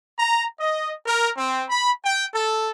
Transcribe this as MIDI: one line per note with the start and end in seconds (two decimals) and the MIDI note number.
0.19 0.45 82
0.59 0.91 75
1.05 1.29 70
1.37 1.64 60
1.69 1.90 83
2.04 2.26 79
2.34 2.70 69